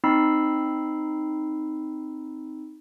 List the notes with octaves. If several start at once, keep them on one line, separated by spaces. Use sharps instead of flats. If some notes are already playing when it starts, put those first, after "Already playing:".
C4 D#4 A#5 B5 E6 C7